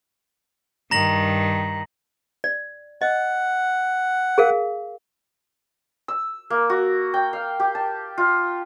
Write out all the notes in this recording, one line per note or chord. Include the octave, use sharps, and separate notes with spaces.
G2 D#3 A#5 A#6 F#7
D5
D#5 F#5
G#4 A#4 F5
E6
A#3
F#4
G5
F5
G4
A5
F4